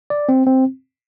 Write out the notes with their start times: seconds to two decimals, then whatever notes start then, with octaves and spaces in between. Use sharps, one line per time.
0.10 D5
0.29 C4
0.46 C4